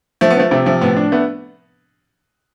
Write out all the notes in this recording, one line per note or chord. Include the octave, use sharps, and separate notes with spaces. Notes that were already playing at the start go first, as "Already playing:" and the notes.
F3 A3
B3
F3 A3
C3 A3
F3 A3
A2 B3
D4
A3 B3